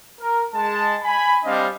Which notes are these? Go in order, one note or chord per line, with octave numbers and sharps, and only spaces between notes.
A#4
G#3 A5
G#5 B5
G3 C4 D4 D#5 F5